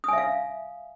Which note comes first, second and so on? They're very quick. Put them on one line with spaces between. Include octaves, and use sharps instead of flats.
D#6 G#5 E5 F5